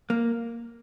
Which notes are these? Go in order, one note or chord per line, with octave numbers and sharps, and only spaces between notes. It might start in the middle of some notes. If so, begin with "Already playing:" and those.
A#3